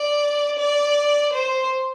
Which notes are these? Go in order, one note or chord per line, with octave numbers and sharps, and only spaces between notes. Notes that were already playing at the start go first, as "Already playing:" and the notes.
Already playing: D5
D5
C5